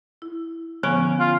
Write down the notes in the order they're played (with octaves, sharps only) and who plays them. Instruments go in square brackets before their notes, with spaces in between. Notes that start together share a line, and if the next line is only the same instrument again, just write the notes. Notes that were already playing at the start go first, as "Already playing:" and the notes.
[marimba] E4
[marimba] D3 F3 B3 [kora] C#4
[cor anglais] F4